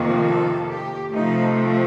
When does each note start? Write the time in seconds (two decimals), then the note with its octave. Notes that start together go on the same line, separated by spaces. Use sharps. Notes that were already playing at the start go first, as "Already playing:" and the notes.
Already playing: F2 C3 D#3 A#3
0.27 A4
0.69 G4
1.13 C3 F3 A3 D#4
1.56 C4